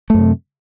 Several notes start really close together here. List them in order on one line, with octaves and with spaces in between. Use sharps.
A3 F#2 C3